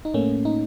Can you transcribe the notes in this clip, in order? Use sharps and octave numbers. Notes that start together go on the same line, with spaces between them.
D#4
A2 A3 A#3 C#4
D#4